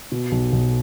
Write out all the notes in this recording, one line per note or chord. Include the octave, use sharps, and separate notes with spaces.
B2
B1
B1